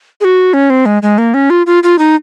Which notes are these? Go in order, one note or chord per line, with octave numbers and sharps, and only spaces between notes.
G#4
F#4
C#4
C4
G#3
G#3
A#3
C#4
F4
F4
F4
D#4